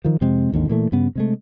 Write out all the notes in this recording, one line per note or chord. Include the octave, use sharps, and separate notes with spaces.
D#3 F3
F2 C3 G#3 C4
G#1 D#2 D3 D#3
A#2 E3 A3
G2 C#3 B3
C3 G#3 A3